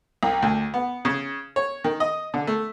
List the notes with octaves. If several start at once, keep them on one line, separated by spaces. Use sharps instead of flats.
C2
D2
B3
C#3
C#5
D#3
D#5
D3
A3